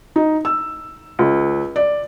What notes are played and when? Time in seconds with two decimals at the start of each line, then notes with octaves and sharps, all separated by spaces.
0.16 D#4
0.45 E6
1.19 C#2
1.76 D5